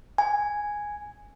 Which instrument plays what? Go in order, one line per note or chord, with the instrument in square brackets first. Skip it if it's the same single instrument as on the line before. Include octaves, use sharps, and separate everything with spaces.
[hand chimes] G#5